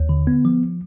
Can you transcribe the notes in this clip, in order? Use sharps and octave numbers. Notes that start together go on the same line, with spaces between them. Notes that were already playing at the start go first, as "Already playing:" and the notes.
Already playing: D#2
D3
B3
F3